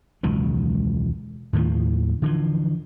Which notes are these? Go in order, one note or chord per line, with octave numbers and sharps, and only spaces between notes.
E1 C#2 D#3 F#3
D#2 A2 D#3 F3
D3 E3 F3